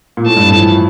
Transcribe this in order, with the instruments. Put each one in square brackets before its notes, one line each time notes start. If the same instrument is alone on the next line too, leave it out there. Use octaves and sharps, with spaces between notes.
[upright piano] A#2
[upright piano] A2 [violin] A5
[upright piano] G2
A2
F3
E3